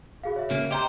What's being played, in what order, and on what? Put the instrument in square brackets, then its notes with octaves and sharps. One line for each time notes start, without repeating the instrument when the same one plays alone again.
[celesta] F#4 G#4 F5
C#5 E5
[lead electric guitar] C#3 A#3
[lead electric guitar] G4 C5 [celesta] D#5 G5 A#5